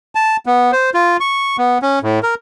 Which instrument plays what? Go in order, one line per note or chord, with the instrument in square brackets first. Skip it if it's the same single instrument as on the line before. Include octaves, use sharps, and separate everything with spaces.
[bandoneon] A5
B3
C5
F4
C#6
B3
C#4
A2
A#4